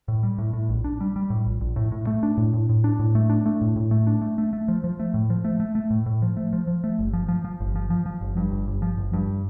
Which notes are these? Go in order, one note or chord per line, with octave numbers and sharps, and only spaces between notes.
A2
G3
A2
A2
A#1
D4
G3
G3
A2
A#1
A#1
A2
A2
A3
D4
A2
A2
A2
D4
A2
A3
D4
A3
A2
A2
A3
D4
A3
A3
A3
F3
F3
A3
A2
F3
A3
A3
A3
A2
A2
F3
A3
F3
F3
A3
G1
F3
F3
F3
G1
F3
F3
F3
G1
G2
G1
G1
F3
G1
G2